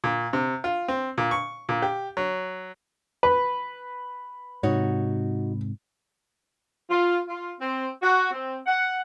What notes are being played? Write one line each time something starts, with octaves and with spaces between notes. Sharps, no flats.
A#2
C3
F4
C4
A#2
C#6
A#2
G4
F#3
B4
G#2 C3 D#4 F#4 C#5
F4
F4
C4
F#4
C4
F#5